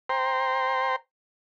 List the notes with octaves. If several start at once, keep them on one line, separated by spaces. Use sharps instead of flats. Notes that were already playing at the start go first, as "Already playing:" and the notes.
C5 G5 A#5 C6